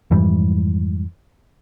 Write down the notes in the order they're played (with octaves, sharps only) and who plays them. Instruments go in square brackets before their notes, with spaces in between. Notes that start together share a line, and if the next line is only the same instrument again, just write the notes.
[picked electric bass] F2 G#2 E3 G3